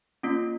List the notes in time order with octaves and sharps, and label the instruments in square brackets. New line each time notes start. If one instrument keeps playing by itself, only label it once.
[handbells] A#3 C#4 F4